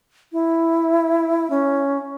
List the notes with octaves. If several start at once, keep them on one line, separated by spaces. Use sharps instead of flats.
E4
C#4